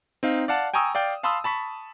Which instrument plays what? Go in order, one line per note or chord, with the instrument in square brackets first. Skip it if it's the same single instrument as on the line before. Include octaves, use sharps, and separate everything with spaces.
[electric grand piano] C4 D#4 F5
D5 F5 F#5 A5
G5 G#5 A#5 C#6 D#6 E6
D5 F5 G5
F5 A5 B5 C6 D#6 E6
A5 B5 C#6 B6